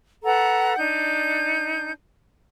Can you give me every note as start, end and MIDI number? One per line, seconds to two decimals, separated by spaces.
0.24 0.77 69
0.24 0.77 71
0.24 0.77 78
0.24 0.77 82
0.78 1.92 62
0.78 1.92 63
0.78 1.92 91